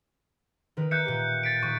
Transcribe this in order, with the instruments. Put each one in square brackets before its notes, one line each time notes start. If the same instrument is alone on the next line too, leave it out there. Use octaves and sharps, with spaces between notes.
[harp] D#3 A#4 B4
[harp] E5 [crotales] F#6 G6 C#7
[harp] A#2 G4
[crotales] A6 B6 D7
[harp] D#1 [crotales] C#6